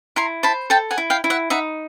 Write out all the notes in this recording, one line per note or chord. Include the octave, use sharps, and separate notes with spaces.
E4 A#5 C6
C5 A5 B5
A4 G5 A5
F#5 G#5
E4
F5 G5
E4
E5 F#5
D#4 E5 F#5